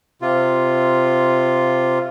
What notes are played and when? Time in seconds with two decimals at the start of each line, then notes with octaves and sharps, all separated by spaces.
0.22 C3 F4